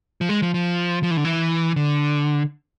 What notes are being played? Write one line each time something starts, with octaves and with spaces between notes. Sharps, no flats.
F3
G#3
F3
F3
F3
E3
D3
E3
D3